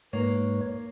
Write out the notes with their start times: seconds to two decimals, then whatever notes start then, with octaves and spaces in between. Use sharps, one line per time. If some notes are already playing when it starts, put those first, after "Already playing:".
0.13 G#2 A#3 B4 C#5